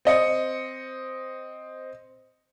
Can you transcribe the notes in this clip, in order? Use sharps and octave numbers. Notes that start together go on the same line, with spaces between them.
C4 D#5 C#7